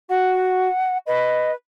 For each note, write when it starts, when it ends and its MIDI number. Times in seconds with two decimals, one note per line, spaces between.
0.10 0.68 66
0.10 0.98 78
1.07 1.55 71
1.07 1.51 75